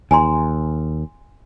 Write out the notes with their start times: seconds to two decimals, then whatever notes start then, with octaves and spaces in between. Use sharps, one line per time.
0.11 D#2 G#5 A#5 C6